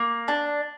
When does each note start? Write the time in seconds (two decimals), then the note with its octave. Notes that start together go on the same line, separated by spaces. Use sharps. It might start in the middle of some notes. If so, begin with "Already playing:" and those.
Already playing: A#3
0.28 D4